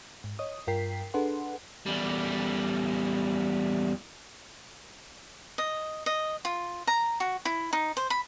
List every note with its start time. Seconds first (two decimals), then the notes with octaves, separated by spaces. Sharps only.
0.24 G#2
0.39 C#5 D#5 D#6
0.67 G2 F4 A#4 G5 B6 C7
1.14 D4 G#4 A4 B4 F#5 C6
1.86 E2 G3
5.58 D#5
6.06 D#5
6.45 F4
6.87 A#5
7.20 F#4
7.45 E4
7.73 D#4
7.97 C5
8.10 B5